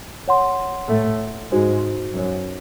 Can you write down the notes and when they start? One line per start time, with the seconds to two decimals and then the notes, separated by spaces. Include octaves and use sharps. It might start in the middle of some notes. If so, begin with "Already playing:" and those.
0.28 C#5 F#5 C6
0.89 A2 A3
1.51 G#2 G#3 D#4 F#4 C5
2.14 F#2 F#3